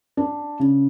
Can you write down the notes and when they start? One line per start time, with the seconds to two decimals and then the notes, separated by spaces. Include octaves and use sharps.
0.17 D4
0.60 C#3